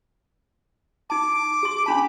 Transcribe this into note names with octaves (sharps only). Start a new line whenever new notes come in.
D#4 A5 D6
G#4 C6
C#4 D4 A5 B5